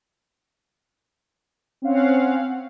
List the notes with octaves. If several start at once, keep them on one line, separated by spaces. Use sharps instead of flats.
C4 C#4 F5 F#5